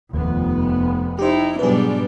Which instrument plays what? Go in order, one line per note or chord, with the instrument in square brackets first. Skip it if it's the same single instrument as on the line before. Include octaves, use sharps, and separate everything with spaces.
[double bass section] F1 B3 [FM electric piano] D#2
[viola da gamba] D#4 E4 [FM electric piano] G4 C5
[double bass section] G#2 F#3 [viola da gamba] B2 G3 D4 [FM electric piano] G#4 B4